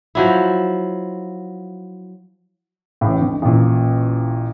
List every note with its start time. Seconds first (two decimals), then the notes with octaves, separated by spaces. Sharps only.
0.15 F3 F#3 E4
3.01 A1 A2
3.21 F2 D3
3.42 A1 A#2